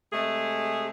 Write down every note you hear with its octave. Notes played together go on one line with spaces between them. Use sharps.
C3 G#3 A3 G#4